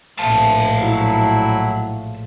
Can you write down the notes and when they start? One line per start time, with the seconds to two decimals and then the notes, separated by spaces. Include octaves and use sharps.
0.19 A#1 A2 E5 F5 A5
0.81 F#3 E4